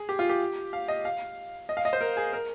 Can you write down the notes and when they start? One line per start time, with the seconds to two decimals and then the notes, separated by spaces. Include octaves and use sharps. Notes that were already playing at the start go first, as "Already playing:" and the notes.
Already playing: G#4
0.09 G4
0.19 F4
0.29 G4
0.73 F5
0.88 D#5
1.05 F5
1.69 D#5
1.77 F5
1.85 D#5
1.93 C5
2.01 A#4
2.17 G#4
2.33 A#4